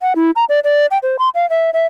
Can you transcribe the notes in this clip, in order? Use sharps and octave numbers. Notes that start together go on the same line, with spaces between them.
F#5
E4
A#5
D5
D5
G5
C5
C6
F5
E5
E5